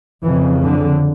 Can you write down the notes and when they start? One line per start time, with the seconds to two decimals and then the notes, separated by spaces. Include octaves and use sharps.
0.23 F2 C#3 E3
0.63 D3